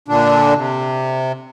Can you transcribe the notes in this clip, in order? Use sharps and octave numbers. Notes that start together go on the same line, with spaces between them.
A#2 D3 D4
C3